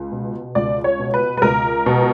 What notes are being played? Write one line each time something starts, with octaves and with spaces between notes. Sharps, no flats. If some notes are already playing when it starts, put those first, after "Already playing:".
Already playing: C#2
B2
C#2 D5
C#5
B2
B4
B4
C#2 A#4
B2